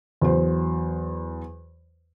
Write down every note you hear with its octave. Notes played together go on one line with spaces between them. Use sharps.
E2 F#3 C5